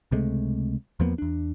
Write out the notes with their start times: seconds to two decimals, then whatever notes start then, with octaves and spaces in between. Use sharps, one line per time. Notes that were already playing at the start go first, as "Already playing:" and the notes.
0.11 C#2 C3 G#3 A3
1.00 E2 F3 A#3 B3
1.18 E2 D4